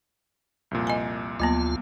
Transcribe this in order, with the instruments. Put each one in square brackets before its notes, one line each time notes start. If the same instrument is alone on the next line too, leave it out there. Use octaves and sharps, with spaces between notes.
[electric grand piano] C2 F2 A#2
[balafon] D#5 G#5
[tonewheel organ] D2 F4 [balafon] F#3 A#3 B3